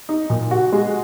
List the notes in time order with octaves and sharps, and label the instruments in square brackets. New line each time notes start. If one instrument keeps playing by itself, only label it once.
[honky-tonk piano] D#4
A#2
F#4
G#3